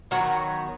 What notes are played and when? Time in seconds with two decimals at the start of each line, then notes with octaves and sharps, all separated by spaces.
0.11 D#3 F#3 B3 F#4 A#4